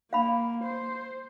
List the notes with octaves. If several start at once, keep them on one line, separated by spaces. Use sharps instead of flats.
A#3 F5 B5
C5